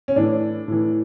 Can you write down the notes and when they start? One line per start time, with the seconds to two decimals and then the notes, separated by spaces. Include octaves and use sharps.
0.08 C#4
0.16 A2 E3 D4
0.68 A2 E3